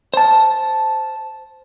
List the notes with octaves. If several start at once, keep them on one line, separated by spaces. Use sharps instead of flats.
C5 A5